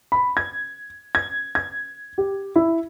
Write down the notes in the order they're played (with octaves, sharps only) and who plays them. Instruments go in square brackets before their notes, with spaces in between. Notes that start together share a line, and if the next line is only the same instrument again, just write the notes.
[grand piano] B5
G#6
G#6
G#6
G4
E4